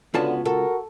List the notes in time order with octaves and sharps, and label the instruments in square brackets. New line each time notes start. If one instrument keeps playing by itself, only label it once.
[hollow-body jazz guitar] C#2 F4 A5 [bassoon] D3 [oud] B3 C#4 F#4
[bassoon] F#4 [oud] A4 [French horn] A#4